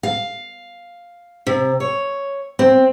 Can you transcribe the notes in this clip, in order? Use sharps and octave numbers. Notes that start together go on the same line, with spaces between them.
F5
C3
C#5
C4